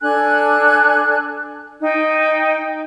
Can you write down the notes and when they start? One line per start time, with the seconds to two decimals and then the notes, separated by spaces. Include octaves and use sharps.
0.01 D4 A4 G#5 F#6
1.81 D#4 G5